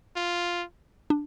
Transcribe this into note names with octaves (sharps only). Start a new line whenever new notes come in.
F4
D4